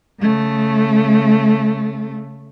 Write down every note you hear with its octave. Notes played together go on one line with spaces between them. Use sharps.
C#3 A3